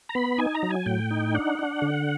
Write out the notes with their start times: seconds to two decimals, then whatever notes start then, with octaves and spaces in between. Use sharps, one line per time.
0.09 A#5
0.15 B3 B5
0.38 D#4 G#5
0.55 A#5
0.63 F#3
0.70 G#5
0.86 A2 G5
1.11 D#4
1.34 D4 F#5
1.59 D4
1.82 D3